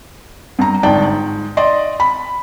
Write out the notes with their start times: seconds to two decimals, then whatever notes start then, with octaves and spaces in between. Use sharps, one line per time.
0.59 G2 A#5
0.83 G1 G#2 D5 G5 A5
1.05 G#2
1.57 D5 D#5 C6
2.00 B5